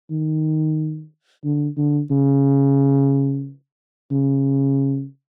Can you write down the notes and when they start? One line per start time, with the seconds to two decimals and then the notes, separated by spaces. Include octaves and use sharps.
0.10 D#3
1.45 D3
1.77 D3
2.11 C#3
4.11 C#3